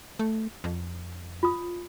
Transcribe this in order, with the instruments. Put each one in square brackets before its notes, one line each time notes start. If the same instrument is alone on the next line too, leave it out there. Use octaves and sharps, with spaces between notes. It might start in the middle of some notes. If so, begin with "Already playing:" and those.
[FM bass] A3
F2
[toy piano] F4 D#6